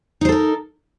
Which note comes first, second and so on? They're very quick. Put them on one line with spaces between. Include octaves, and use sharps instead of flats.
D#4 C5 A4 A#4